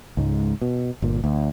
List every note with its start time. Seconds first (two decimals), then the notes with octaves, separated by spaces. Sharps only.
0.17 C#2 G#2
0.62 B2
1.02 G1 A#2
1.24 D2